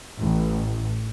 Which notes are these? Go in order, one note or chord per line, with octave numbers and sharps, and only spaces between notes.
A1